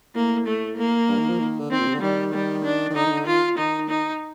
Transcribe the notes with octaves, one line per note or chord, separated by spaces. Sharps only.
A2 A#3
A3
A#3
G2
D#3
F3
D#3
D3
D#3 C4
A#2
C3
D3
D#3 G3
G3
D4
D#3
D3 D#4
D#3
D3
D#3 F4
D#3 D#4
D#4